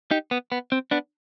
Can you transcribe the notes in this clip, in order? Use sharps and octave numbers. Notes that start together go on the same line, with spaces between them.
D#4 G4
B3
B3
C4
B3 D4